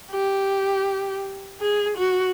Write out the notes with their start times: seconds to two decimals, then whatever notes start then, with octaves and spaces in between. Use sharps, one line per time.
0.11 G4
1.60 G#4
1.97 F#4